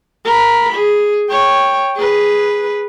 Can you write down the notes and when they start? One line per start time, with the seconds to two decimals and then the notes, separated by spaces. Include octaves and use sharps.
0.25 A#4 B5
0.73 G#4
1.29 C#5 G5
1.96 G#4 B4